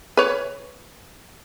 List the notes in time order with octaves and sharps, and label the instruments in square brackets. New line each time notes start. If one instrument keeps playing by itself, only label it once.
[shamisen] B4 C#5